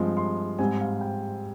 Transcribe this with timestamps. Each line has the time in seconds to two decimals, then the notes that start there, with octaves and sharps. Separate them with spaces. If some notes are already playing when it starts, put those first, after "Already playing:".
Already playing: G2 F3 G#3 C4 C6
0.17 C6
0.59 G#2 G3 C4 G#5
0.81 F5
1.01 G5